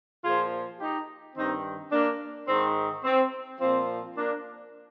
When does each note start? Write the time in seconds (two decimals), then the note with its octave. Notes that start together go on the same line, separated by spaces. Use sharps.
0.24 A#2 F3 F4 G#4
0.80 D#4 G4
1.36 G2 D#3 C4 D#4
1.92 A#3 D4
2.48 G#2 D#3 C4
3.04 C4
3.60 A#2 F3 C4
4.16 A#3 D4